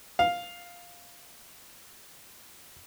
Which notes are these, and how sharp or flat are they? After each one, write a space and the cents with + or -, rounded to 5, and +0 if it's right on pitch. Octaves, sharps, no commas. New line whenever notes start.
F5 +5